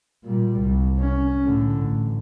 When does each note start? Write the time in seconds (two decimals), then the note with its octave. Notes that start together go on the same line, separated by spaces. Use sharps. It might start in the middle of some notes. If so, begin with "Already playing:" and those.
0.24 A#2 G3
0.61 C2
0.99 C#4
1.44 A2 D3
1.84 A1